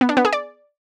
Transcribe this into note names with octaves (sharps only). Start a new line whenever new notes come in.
B3
D4
B3
G#4
D5